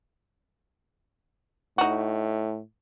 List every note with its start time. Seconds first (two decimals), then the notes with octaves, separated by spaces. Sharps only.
1.78 A2 D#4 F#4